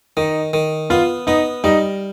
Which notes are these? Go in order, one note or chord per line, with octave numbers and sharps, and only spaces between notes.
D#3 D#4
D#3
B3 F4
B3 D#4
G3 D#4